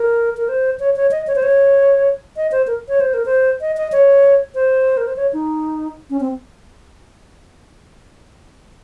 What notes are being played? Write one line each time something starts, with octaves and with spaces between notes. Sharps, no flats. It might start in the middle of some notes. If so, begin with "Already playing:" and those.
Already playing: A#4
A#4
C5
C#5
C#5
D#5
C#5
C5
C#5
D#5
C5
A#4
C#5
C5
A#4
C5
D#5
D#5
C#5
C5
A#4
C5
C#5
D#4
C#4
C4